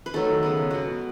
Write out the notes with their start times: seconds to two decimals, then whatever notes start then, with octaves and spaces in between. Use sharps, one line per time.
0.06 B4
0.14 D#3 F#3 A3 A4
0.43 C#3 G#3 B3
0.71 B2 F#3 B3 F#4